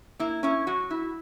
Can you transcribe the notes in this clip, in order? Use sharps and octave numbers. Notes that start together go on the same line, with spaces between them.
A#3 E4
C#4 E4
F#3 F#4
E4